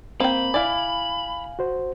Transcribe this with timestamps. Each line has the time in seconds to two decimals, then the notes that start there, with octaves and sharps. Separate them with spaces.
0.20 A#3 C4 G5 B5
0.54 E4 D5 F5 G#5
1.59 F#4 C5